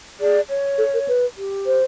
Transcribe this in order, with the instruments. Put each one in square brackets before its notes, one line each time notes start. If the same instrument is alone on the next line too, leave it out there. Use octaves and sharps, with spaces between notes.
[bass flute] G#4 [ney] D5
[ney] C#5
[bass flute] A4
A#4
B4
[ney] G4
[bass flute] C5